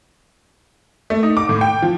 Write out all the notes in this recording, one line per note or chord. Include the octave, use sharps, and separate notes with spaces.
A3
D#4
D6
A2
G5
F3